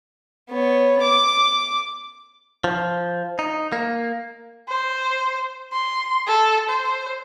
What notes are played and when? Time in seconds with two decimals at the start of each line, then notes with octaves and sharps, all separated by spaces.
0.50 B3 C#5
1.03 D6
2.64 F3
3.39 D#4
3.72 A#3
4.69 C5
5.72 C6
6.27 A4
6.69 C5